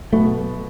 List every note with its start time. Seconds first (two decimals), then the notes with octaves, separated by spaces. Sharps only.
0.13 B2 F#3 A3 B3 F#4 A4